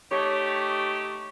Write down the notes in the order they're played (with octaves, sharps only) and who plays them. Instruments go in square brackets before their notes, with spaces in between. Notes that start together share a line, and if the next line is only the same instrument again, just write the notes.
[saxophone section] A3 D#4 G4 [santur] C#5